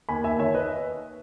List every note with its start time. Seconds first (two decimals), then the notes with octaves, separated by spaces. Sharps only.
0.09 D#2 G#5 B5
0.24 D#2 E5 G#5
0.39 D#3 C#5 E5
0.54 B4 D#5